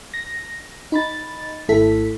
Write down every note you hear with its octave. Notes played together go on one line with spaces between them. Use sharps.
A#6
D#4 B5 A6
G#1 A3 E4 A4 B6